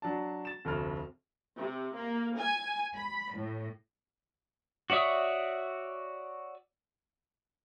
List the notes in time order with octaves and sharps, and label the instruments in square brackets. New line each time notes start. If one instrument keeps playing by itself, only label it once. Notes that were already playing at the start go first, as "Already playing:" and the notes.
[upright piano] F#3 D4 A5
A6 E7
F1 D2 C5 F6
[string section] C3
A#3
G#5
B5
A2
[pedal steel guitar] F#4 C#5 D5 E5 D#6